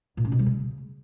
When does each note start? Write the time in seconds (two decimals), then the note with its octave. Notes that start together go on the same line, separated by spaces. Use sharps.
0.17 A#2
0.25 C#4
0.32 B2
0.39 G3
0.46 C#3